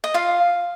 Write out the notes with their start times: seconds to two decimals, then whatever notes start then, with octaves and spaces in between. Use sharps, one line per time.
0.04 D#5
0.14 F4 F5